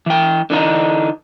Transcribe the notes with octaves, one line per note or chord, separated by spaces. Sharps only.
E3 G5
D3 E3 D4 D#4